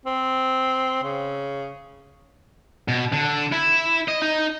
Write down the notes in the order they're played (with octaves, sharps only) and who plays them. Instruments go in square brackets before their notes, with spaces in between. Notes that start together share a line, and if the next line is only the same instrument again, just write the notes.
[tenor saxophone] C4
C#3
[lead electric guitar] B2
D3
E4
D#5
D#4